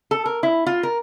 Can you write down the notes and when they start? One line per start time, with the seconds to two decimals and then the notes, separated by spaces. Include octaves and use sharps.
0.11 A4
0.26 A#4
0.43 E4
0.66 F4
0.83 A#4